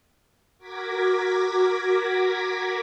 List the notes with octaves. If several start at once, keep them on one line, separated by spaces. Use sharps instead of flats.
F#4 A#4 D6 G#6 A#6 B6